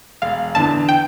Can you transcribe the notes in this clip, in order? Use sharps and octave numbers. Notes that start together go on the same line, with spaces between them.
E1 F5
E2 D3 A5
G5